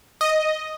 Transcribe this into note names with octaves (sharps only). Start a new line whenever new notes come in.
D#5